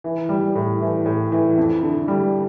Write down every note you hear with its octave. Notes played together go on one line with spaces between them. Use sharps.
E3
G3
A2
E3
A2
E3
F2
D3
G3